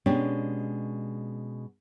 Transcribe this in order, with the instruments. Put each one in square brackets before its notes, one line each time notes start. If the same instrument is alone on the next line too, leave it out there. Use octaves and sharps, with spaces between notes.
[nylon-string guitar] B2 G#3 C#4 D4 G4